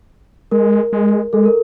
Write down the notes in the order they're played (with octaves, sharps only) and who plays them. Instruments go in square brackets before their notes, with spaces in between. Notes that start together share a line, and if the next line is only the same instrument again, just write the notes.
[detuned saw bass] G#3 [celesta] A#4
[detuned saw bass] G#3
[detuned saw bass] G#3 [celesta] A4
[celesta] A#4